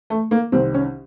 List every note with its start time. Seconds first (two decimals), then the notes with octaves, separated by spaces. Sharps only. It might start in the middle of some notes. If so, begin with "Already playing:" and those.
0.10 A3
0.31 A#3
0.52 C2 C3 D#3 C4
0.74 C#4